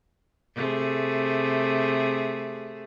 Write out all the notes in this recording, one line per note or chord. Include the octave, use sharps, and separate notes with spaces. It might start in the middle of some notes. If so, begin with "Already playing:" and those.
C3 A3 G#4